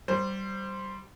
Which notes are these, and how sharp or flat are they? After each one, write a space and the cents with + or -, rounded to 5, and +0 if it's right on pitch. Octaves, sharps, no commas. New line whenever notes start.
G3 -15 C5 +0